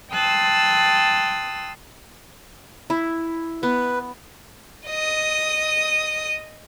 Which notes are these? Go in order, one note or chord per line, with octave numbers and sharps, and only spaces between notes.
G5 A5 C6 D#6 E6 F#6
E4
B3 B4
D#5 D#6